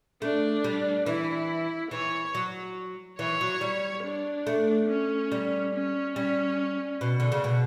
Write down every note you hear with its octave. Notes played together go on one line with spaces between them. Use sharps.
A3 D4
G3
E3 E4
E3 C#5
F#3
E3 C#5
F#3
G3
D4
A3
C#4
G3
C#4
G3 C#4
B2
D3
C#3
B2